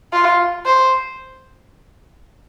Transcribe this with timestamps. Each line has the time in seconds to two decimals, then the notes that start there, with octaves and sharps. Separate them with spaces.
0.13 F4
0.66 C5